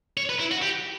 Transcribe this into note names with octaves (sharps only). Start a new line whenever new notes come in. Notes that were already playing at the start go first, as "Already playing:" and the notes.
C#5
B4
E4
F#4
G4